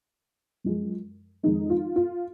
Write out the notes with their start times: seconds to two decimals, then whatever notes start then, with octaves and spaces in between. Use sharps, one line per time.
0.64 F#2 F3 G#3
1.43 F2 D#3 G#3 D#4
1.70 F4
1.96 F4